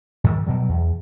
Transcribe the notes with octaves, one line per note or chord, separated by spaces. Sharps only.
G#2 D#3 E3 G3
B2 F#3 G3
E2